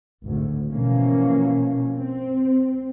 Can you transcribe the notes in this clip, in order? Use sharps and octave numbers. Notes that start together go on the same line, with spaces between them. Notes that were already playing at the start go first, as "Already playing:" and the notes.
G#1 D2 A2
B2 E3 F3 A#3 C#4
C4